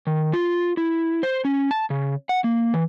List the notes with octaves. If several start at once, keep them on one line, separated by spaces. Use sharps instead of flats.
D#3
F4
E4
C5
C#4
A5
C#3
F#5
A#3
E3